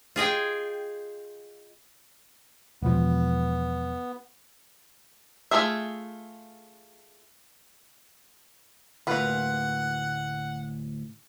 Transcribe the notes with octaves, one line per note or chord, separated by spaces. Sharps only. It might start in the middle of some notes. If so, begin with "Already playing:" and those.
F4 G#4 D#5 G5
E1 F3 B3
A3 D#4 F4 G#4 E5
D2 A2 A#3 F4 B4 F#5